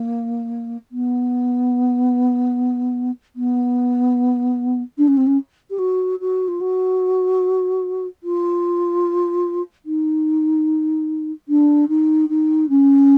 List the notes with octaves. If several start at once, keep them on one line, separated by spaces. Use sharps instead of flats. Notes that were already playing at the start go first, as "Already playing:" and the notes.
Already playing: A#3
B3
B3
D4
C#4
C4
C#4
G4
F#4
F#4
F4
F#4
F4
D#4
D4
D#4
D#4
C#4